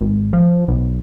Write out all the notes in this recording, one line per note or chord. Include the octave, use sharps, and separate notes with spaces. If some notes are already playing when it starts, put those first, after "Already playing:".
G#1
F3
B1